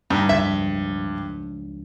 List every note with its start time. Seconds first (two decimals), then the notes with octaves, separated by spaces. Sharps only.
0.10 G2 D#4
0.29 C#2 F3 D4 E5